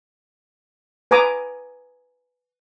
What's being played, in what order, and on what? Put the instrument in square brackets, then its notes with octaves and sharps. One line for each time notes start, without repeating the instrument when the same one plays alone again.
[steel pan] B4 G#5 A#5 D6 D#6